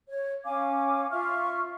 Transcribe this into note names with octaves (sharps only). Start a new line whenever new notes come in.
C#5
C#4 F5 G#5 D6
F4 E5 C#6 F6